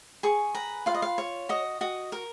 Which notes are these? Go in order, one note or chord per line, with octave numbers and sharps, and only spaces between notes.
G#4 C#6
B4 A#5
F4 F5
D#5
F5
C#5
F#4 D#5
F#4 D#5
A#4